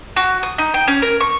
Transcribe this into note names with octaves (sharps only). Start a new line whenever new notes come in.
F#4
D#6
D#4
G5
C#4
A#4
C#6